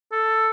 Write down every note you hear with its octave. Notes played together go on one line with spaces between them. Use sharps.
A4